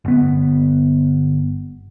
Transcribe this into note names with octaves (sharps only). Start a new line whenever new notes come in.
G1 B3